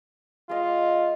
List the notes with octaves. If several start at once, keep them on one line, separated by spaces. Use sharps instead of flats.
G#3 F4 D#5